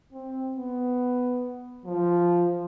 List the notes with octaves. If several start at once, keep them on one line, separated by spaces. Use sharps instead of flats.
C4
B3
F3